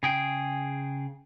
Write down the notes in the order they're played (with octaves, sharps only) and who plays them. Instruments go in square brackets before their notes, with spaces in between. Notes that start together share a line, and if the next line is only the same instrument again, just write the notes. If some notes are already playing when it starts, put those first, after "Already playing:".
[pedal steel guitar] C#3 G#4 G5